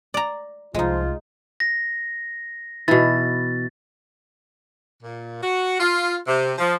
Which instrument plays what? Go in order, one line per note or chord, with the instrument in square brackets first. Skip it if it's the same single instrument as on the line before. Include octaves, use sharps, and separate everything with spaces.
[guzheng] D5 A#5
[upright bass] C2 [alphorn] F3 [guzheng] G#3 D#4 [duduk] F4
[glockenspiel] A#6
[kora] B2 E3 [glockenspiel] A6
[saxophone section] A#2
F#4
F4
C3
F3